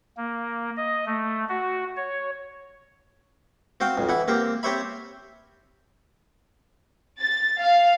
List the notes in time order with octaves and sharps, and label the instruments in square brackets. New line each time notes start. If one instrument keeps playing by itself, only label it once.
[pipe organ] A#3
D#5
A3
F#4
C#5
[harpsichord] C4 F#4 F5 G5
B1 F2
E3 E4 F#5
A#3 C4 G4 C5
C4 G4 C5 C#5 E5 B5
[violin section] A6
F5